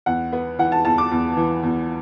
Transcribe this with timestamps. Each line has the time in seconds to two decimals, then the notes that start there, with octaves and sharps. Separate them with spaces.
0.06 E2 F#5
0.33 B3
0.59 E3 F#5
0.72 A5
0.85 E2 A5
0.98 D6
1.11 E2
1.37 E3
1.63 E2